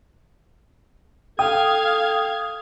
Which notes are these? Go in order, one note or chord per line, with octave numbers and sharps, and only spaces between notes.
A4 F5 G5 D#6 G#6